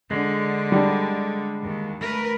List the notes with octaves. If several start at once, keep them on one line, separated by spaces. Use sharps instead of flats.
D3 G#3
G3 D4
D#2
A3 A#4 B4